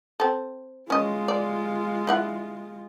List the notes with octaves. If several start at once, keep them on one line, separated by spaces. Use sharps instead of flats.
C4 A4
G#3 C#4 F4 D#5
D5
D4 E4 F#5